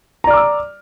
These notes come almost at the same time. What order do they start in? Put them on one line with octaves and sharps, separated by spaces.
A#5 D5 F6 D6 E6